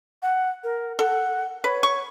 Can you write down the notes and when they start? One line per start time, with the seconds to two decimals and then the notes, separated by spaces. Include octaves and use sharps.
0.22 F#5
0.64 A#4
0.99 A4 F#5
1.64 B4 C#5
1.83 C#6